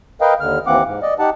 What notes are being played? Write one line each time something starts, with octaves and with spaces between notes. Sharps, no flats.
A#4 B4 D#5 F5 G5
D#2 D3 F6
D#2 E3 A#3 C4 F#5 D6
G#2
D5 D#5
D#4 G4 F#5 A5